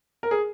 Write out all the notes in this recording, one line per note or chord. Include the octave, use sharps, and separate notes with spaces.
A#4
G#4